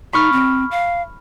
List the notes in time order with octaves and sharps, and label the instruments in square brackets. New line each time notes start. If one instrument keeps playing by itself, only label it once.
[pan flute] D#4 [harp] B5 C#6 F6
[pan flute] C4
F5